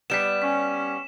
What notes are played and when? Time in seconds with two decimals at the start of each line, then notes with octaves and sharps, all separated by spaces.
0.10 G3 B3 B6 E7
0.42 C#4 B6